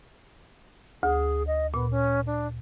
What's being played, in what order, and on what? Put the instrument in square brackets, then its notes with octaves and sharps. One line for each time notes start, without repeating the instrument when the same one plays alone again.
[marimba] D2 [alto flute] G#4
[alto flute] D#5
[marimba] A#2 [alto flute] B3
[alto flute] C#4
D4